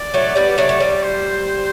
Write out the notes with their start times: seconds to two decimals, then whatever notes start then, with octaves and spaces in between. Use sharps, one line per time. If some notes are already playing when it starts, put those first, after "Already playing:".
Already playing: D5
0.14 F#3 A3
0.36 G3 B3
0.58 F#3 A3
0.69 A3
0.80 G3
1.03 C5